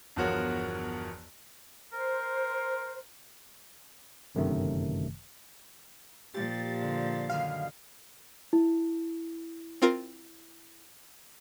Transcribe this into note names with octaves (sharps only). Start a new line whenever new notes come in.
G1 E2 F3 F#4 A#4 C#5
A#4 C5
G1 F#2 C3 D#3 A3
A#2 F3 G4 A6
D3
F#2 D3 D#3 F5
E4
C4 F4 A#4